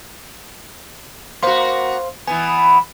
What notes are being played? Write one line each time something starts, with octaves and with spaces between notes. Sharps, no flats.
A#3 F#4 C5 F5 C6
E3 B3 G#5